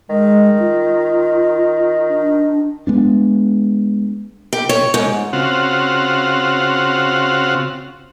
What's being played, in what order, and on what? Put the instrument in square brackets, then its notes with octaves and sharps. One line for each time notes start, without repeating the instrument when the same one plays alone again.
[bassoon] D#3 [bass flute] G#3
[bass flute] F4
D4
[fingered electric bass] G#3 B3 D4
[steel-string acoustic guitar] G4
C#5
G#2
[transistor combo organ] C#3 C4 F4 F#4